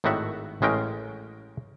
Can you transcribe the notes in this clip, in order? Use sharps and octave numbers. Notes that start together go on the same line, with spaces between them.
G#1 A2 D#3 F#4 E5 F#5
A1 G#3 C#4 A#4 G5